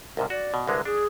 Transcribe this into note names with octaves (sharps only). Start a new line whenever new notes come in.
C2 G#2 C3 A#4
F#4 D5
B2
C2 D3 G#3 B4
D4 G#4